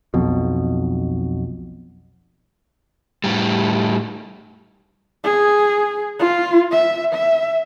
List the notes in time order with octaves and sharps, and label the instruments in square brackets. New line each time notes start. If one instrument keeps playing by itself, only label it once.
[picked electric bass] B1 F2 B2
[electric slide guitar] A2 G3
[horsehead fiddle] G#4
F4
E5
E5